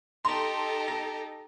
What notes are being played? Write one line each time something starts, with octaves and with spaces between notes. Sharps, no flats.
D#4 G4 A4 A#5 C6
A#6